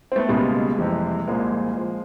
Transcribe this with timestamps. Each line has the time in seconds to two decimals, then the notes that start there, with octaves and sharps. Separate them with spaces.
0.12 C4
0.16 A3 B3
0.29 C#2 B2 G3 G#3 A#3
0.78 F2 C3 E3 G3
1.27 C2 A#2 F3 G#3 A#3
1.77 F3